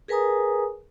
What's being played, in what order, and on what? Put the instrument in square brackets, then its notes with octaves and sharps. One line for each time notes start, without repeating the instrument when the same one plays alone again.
[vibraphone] G#4 A#4 B4 G#5 A#5 D#6